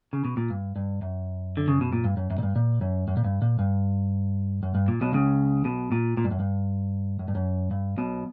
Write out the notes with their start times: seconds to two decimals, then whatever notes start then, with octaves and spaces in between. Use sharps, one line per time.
0.13 C#3
0.25 B2
0.37 A#2
0.50 G2
0.76 G2
1.02 F#2
1.57 D3
1.68 C#3
1.81 B2
1.93 A#2
2.04 G2
2.17 F#2
2.31 F#2
2.38 A#2
2.43 G2
2.56 A#2
2.81 F#2
3.08 F#2
3.17 A#2
3.25 G2
3.42 A#2
3.59 G2
4.63 F#2
4.75 G2
4.88 A#2
5.01 B1 B2
5.13 C#2 C#3
5.65 B1 B2
5.92 A#2
6.17 A#2
6.24 G2
6.31 F#2
6.40 G2
7.19 F#2
7.28 G2
7.35 F#2
7.71 G2
7.98 B1 B2